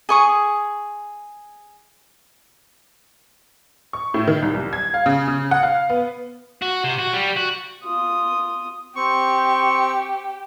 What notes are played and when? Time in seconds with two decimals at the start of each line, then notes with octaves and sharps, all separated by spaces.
0.09 G#4 C#6 D#6
3.93 C#6
4.14 A2
4.27 D#3
4.42 C2
4.54 C2
4.73 G#6
4.94 F5
5.06 C#3
5.28 C#3
5.51 F#5
5.63 F5
5.90 B3
6.62 F#4
6.84 C3
6.99 F#4
7.14 G3
7.37 F#4
7.83 F4 D#6
8.96 C4 G4 C#6